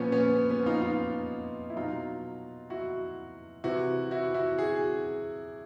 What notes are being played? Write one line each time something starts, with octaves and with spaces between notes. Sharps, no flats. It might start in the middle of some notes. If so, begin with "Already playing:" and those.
Already playing: A#2 F3 B3 C#4
B3 C#4
B3
B3 C#4
D#4 F4
D#4 F4
E4
B2 F#3 D#4 F4
E4 F#4
C3 E3 E4 F#4
E4 F#4
E4 F#4
F#4 G#4